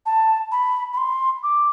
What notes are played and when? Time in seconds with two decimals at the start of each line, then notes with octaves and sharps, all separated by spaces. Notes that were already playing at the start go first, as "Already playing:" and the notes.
0.06 A5
0.52 B5
0.93 B5
0.97 C6
1.43 D6